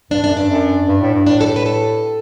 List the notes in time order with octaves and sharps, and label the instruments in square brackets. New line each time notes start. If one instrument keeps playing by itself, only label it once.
[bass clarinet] G2 [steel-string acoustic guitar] D4
[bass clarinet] F#2 [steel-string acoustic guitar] D4
[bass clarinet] G2 [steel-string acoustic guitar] D4
[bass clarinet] F#2
G2
A2
G2
[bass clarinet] A2 [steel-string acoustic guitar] D4
[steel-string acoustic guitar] A4
G4
B4
A4